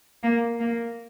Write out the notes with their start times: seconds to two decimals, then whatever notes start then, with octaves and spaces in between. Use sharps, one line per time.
0.23 A#3
0.60 A#3